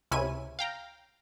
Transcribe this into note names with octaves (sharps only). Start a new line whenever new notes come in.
C#2 C3 C#4 E4 G#5 D#7
F5 G5 A#5